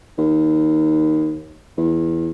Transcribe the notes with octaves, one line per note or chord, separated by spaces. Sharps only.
D#2
E2